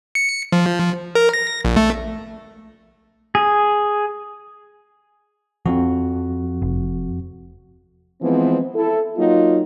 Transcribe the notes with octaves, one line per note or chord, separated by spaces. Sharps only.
C#7
F3
A#4
A#6
A#1
A3
G#4
F2 F3 C4 F#4
F1
E3 F3 G#3 B3 C4
E4 A4
F#3 A#3 D#4 F4